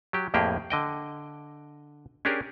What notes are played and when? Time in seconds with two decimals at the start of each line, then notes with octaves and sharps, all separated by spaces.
0.13 F#3 G4
0.34 F2 A2 A#3 G4 G#4 G5
0.70 D3 D#5 G5
2.25 C#4 D4 G4 G#4 A#4